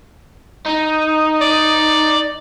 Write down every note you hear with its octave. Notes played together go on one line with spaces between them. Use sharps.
D#4
D5